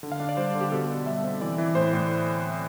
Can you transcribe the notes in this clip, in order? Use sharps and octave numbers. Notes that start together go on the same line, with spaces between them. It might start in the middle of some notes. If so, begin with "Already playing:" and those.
D3
F5
D4
D5
G3 C5
D3
G4
B2 A4
B2
G3 E5
C4
E3 D5
E3
A2 C5
A2